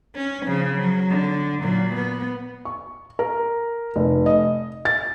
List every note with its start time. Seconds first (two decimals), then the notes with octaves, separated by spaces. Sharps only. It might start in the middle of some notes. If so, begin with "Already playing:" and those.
0.15 C#4
0.46 C#3 F3
0.77 F#3
1.10 D3
1.63 A#2 F#3
1.95 B3
2.65 C#6
3.19 A#4
3.96 F1
4.26 D#5
4.85 A6